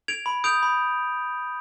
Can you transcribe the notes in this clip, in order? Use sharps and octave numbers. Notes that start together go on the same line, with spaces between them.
G#6 D7 F7
B5
D#6 G6 D7 F7
B5